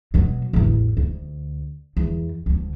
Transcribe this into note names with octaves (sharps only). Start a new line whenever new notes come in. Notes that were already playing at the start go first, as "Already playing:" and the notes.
B2 F#3
A1 E2
D2
E2
D2 D3